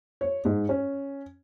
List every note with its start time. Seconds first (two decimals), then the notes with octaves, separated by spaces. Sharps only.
0.21 C#5
0.45 G#2
0.69 C#4